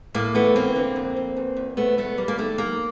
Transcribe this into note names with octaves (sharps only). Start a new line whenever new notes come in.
A2 A#3
E3 A3 B3
D2 A#3 C4
D3
F2
F2
E2
E2
B2 A3 B3
E2 A3 B3
G3 A#3
A#3
D#3 A3
F#3 A#3